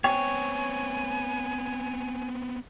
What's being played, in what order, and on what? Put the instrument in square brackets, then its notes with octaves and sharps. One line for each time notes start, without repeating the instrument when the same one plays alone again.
[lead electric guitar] B3 C4 [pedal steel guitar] C#5 [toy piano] G5 [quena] G#5